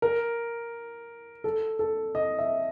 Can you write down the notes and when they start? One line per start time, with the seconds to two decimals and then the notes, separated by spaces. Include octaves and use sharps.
0.02 A#4
1.44 A4
1.79 A4
2.15 D#5
2.39 E5